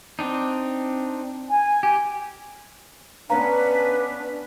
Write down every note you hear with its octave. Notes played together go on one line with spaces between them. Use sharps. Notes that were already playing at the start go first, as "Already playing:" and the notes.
C4 D4 D#4
G#5
G4
B3 C#4 D4 B4 F5 A#5